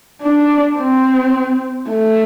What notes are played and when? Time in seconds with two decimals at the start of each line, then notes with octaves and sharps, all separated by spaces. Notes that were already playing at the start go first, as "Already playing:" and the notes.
0.22 D4
0.78 C4
1.90 A3